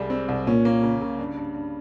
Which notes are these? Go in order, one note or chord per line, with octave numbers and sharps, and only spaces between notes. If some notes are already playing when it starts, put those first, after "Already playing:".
Already playing: C2 G3 G#3
C4
C2
A#2 C#4
A#3
C#3
C#3
G2
G2
G2